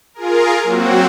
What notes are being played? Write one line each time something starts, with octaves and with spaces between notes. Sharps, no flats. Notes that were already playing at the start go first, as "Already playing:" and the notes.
F4 G#4 A#4
F#3 A#3 C4 F#4